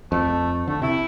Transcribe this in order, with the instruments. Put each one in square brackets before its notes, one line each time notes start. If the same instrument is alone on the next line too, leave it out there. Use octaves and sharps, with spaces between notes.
[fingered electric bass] F2 [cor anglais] A3
[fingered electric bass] D3 [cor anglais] A3
[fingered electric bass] C3 [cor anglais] E4